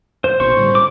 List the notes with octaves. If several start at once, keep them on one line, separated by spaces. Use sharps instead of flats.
C5
A#1 B2 C5 C#6
A2 D3 G3
D6